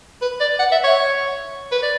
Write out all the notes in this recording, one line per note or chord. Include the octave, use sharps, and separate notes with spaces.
B4
D5
F#5
E5
C#5
B4
D5